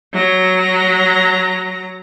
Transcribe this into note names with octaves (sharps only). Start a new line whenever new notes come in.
F#3 A#5